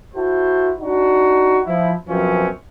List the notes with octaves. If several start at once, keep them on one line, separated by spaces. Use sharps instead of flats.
E4 F#4 A4 C5
D4 D#4 F#4
F3 E4
F#2 B2 F3 C4 C#4